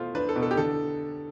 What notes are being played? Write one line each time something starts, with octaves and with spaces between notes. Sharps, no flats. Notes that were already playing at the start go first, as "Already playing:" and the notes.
Already playing: B2 A3 F4 C5
D4 B4
A4
B2
A4
G4
D3 A4